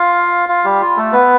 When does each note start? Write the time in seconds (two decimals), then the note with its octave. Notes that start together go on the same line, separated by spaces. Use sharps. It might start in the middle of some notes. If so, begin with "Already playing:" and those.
Already playing: F4 F5
0.49 F4 F5
0.65 G3 G4
0.82 F4
0.97 A3 A4
1.13 B3 B4